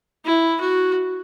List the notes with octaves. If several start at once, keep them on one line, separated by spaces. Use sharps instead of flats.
E4
F#4